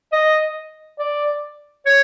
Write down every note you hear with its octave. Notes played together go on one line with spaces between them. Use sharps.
D#5
D5
C#5